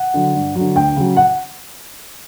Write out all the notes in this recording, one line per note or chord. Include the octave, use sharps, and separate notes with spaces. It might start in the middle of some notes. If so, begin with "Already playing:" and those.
Already playing: F#5
D3 F#3
G2
D3 F#3
D2 G5
C#3 F#3
F#5